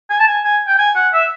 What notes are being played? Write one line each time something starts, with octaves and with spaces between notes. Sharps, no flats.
G#5
A5
G#5
G#5
G5
G#5
F#5
E5